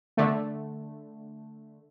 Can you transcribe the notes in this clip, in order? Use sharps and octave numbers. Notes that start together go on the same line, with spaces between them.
D3 A3